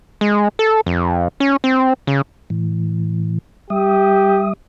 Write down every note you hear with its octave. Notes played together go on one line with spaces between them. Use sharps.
G#3
A4
F2
C#4
C4
C#3
A2 E3
G3 G4 E5 D#6